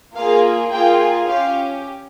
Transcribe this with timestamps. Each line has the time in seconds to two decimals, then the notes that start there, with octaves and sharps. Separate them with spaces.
0.15 A#3 F4 G#4 F5
0.72 A#3 F4 G#4 G5
1.28 C#4 G4 F5